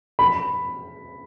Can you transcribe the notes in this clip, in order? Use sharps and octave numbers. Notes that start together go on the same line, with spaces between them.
B5